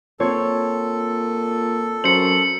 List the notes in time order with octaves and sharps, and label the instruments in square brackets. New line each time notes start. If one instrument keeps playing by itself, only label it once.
[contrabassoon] A#2 [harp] C4 C#5 [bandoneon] A4
[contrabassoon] F#2 [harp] C5 A#5 [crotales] C#7 F#7